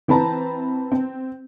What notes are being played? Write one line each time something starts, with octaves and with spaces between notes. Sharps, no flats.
E3 C4 B4 A5 A#5
C4